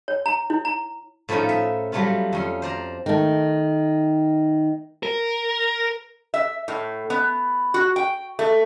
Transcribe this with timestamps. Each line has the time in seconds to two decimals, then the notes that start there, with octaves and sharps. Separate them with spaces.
0.08 C#5
0.26 A#5
0.50 E4
0.65 A#5
1.29 A2 F3 A3 C#4 D#4
1.49 E5
1.92 F#3 G3 A3 B3 F4
2.33 F2 C#4 C6
2.62 C5 D5 A#5
3.06 D#3 A3
5.03 A#4
6.34 E5
6.68 A2
7.10 B3
7.74 F#4
7.96 G5
8.39 A3